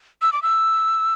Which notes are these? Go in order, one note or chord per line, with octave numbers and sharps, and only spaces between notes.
E6
D6
E6